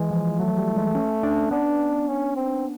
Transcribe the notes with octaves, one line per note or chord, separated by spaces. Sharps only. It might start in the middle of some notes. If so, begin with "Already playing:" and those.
Already playing: E3 G#3
F3
F#3 A3
F#3
G3
G#3
C#4
D4
B3 D4
C#4
C4